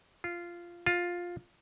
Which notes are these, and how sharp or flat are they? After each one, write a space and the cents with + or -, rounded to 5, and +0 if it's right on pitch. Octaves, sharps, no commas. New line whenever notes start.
F4 -10
F4 +10